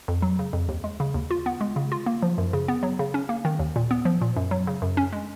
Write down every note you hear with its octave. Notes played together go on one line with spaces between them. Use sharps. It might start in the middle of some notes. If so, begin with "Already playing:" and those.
F2
F#3
C#3
F2
D#2
G#3
C#3
D#2
F4
B3
G#3
C#3
F4
A#3
F3
F#2
C#3
B3
F#3
C#3
C#4
A#3
D#3
D#2
A#2
B3
F3
A#2
F#2
F#3
C#3
F#2
C#4
G#3